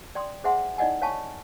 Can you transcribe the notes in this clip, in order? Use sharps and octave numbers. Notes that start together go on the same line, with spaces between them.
D5 G5 C6 D#6
G#4 C5 E5 F#5 G#5 C6
D#4 E4 D5 D#5 F#5 G#5
C#5 F5 G#5 A5 C#6